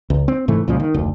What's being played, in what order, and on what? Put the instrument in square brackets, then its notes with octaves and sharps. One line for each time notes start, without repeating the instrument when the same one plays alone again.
[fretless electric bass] C#2
C4
G#2 C3 E3 A3
C2 A#2 C#3 F3
D#3
F1 D2